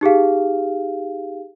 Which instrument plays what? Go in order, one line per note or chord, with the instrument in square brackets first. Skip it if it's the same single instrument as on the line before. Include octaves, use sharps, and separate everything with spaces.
[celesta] D#4 G4 G#4 F5